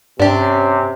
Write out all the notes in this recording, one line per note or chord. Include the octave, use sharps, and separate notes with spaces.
G2 C3 C#4 D4 G4